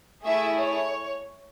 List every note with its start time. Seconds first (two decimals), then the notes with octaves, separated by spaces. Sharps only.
0.24 A3 E4 G#4 E5
0.59 C#5